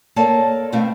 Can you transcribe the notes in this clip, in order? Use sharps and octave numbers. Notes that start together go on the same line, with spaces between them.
A#3 A4 C#5 D5 A5
B2 A3 C4 E5 F5